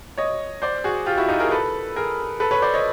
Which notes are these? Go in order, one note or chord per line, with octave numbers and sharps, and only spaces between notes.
C#5 D#5
C5 D5
F#4 G#4
F4 G4
E4 F#4
D#4 F4
G#4 A#4
A4 B4
G#4 A#4
A4 B4
B4 C#5
C5 D5
C#5 D#5